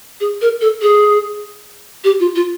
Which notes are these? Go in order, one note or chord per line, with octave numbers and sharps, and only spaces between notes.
G#4
A#4
A4
G#4
G4
F4
F4